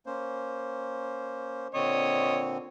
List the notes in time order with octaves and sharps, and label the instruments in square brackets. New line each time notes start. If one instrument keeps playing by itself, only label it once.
[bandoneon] A#3 C#4 C5
[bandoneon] A#2 D3 C4 [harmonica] C#5 D#5